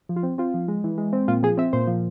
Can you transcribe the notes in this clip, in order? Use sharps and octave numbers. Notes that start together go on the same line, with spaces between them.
F3
F4
C4
C4 F4
F3
G#3
E3
G#3
C4
A#2 F4
F3 G#4
C4 E5
A#2 C5
F3